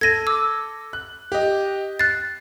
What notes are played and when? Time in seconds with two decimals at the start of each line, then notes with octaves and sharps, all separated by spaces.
0.01 A4 G#6 A#6 D#7
0.27 D6 E6
0.93 F#6
1.32 G4 D#5
1.99 F#6 A6 C7